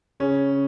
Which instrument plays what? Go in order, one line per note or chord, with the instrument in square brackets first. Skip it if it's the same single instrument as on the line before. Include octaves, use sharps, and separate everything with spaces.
[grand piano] C#3 C#4